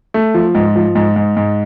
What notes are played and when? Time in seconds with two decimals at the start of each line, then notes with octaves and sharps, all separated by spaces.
0.14 A3
0.34 F3
0.55 G#2
0.76 F3
0.95 G#2
1.16 G#2
1.37 G#2